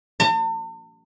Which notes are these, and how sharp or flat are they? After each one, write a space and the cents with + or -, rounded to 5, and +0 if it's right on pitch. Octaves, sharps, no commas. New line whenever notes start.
A5 +45